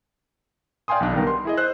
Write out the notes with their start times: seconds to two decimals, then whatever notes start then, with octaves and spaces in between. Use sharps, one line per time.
0.88 D5 F5 G5 G#5 C6 D#6
1.00 B1 D4
1.13 D#3 G3 B3 A#4
1.27 C6
1.45 E4 G#4 D#5
1.57 C5 E6 F#6